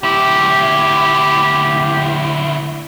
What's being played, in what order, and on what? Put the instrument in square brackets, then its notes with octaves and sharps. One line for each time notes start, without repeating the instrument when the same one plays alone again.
[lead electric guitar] D2 E4 [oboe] G4